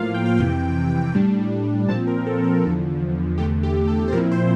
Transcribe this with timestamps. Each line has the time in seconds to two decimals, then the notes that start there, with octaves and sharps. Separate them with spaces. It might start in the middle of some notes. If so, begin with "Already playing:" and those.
Already playing: A2 F3 A#3 F4 F5
0.14 G5
0.26 F5
0.37 F2 C3 E3 G5
1.14 A2 G3 D4
1.88 A#2 F3 C4 A5
2.07 A#4
2.26 A4
2.44 A4
2.63 E2 D3 F3
3.37 E2 D3 A3 G4
3.63 G4
3.88 A4
4.08 C5
4.12 A#2 F3 C4 E4 A#4
4.31 C5